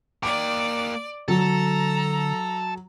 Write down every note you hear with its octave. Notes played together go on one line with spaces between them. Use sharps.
A#3 D5 G5 D6
D3 F#3 A4 A#5